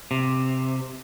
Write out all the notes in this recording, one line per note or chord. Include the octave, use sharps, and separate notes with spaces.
C3